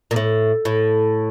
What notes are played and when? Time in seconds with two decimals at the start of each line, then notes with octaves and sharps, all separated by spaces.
0.11 A#2
0.16 A2
0.65 A2